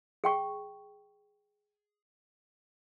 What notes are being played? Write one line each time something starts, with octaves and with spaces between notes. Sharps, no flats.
G#4 G5 C#6